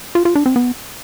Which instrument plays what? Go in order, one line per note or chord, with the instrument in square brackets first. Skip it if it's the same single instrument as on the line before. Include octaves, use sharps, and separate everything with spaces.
[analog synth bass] F4
F4
D4
C4
B3